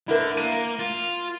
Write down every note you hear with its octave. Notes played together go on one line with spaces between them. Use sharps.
D3 E4 A#4
A#3 D#7
F4